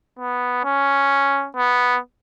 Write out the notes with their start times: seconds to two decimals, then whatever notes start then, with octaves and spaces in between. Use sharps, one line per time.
0.19 B3
0.65 C#4
1.57 B3